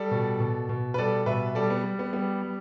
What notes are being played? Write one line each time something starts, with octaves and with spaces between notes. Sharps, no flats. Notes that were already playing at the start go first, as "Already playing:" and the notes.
Already playing: G3 A4 D5
B2
B2
B2
B4
G3 A4 D5
B2 B4 E5
G3 A4 D5
B3
G3
B3
G3 B3
G3